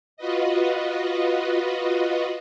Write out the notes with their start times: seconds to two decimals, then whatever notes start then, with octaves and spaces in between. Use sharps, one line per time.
0.17 F4 F#4 B4 D#5